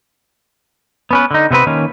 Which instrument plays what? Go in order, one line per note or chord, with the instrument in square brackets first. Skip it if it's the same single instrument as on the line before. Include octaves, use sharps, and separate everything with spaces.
[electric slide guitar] B3 C#4 B4
D3 D#4
C3 B3 C4 B4
D#3 A#3 C#4